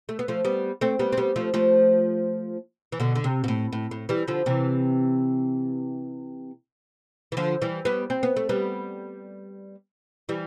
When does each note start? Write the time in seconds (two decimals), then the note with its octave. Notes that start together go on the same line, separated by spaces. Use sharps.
0.09 A3
0.19 B3
0.28 F3 A3
0.45 G3 B3
0.81 A3 C4
0.99 G3 B3
1.12 C4
1.17 G3 B3
1.36 F3 A3
1.54 F3 A3
2.92 E3
3.00 B2 D3
3.15 D3
3.24 C3
3.44 B2
3.48 A2
3.73 A2
3.91 A2
4.09 E3 G3
4.28 D3 F3
4.46 C3 E3
7.32 E3
7.37 D3 F3
7.62 E3 G3
7.85 G3 B3
8.10 C4
8.23 B3
8.37 A3
8.49 G3 B3
10.29 E3 G3